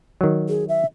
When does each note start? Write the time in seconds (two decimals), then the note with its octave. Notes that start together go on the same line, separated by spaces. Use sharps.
0.21 D#3 F#3
0.49 G#4
0.69 E5